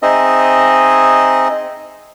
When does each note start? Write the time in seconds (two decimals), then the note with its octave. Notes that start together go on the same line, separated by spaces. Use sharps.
0.02 C4 D#4 G#4 D#5 E5